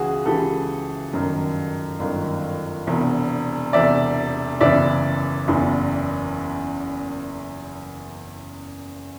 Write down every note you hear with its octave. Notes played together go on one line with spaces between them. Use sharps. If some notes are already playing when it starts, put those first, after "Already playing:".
Already playing: C#2 C#3 E3 F#4 G#4
C#2 C#3 E3 G4 A4
G1 F#2 D#3
G1 F#2 D#3
E1 E2 C3
E1 E2 C3 D5 E5
F#1 E2 C#3 E3 D5 E5
F#1 E2 C#3 E3